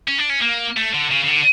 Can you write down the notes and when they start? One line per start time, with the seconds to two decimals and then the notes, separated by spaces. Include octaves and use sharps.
0.08 C#4
0.19 D4
0.30 C#4
0.42 A#3
0.77 A3
0.93 D3
1.11 C#3
1.24 C#3
1.28 D3